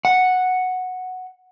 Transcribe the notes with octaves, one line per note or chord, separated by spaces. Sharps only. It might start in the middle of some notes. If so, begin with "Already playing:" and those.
F#5